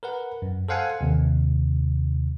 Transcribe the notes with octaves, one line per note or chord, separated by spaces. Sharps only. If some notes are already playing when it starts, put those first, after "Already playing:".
A#4 B4 F#5
F#2
A4 C5 F5 F#5 G#5
D#2 C3